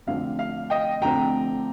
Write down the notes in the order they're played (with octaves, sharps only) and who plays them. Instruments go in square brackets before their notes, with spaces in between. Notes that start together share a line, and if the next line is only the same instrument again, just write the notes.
[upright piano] F2 D3 A3 C4 F5
F5
D#5 G5
F2 D3 A3 C4 G5 A#5